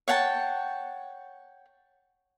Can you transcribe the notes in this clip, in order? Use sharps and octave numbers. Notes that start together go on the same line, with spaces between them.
C#5 F#5 G5 A5